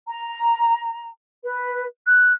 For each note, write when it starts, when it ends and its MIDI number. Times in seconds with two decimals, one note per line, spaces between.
0.09 1.08 82
1.43 1.85 71
2.07 2.32 90